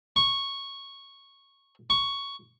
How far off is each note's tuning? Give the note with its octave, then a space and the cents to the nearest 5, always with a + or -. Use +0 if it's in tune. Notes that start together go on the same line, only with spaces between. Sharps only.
C#6 -10
C#6 +5